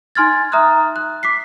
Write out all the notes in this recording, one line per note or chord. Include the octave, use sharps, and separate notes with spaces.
D#4 G#5 C6 F6 G#6 A6
E5 A#5 D#6 F6 F#6
F#6
D6 B6 C7